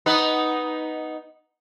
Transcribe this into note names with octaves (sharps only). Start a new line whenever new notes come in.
B3 D#4 B4